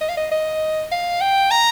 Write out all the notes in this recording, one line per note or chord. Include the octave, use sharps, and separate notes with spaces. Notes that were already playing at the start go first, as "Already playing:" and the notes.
D#5
F5
D#5
D#5
F5
G5
A#5